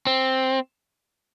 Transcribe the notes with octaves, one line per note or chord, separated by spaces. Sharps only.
C4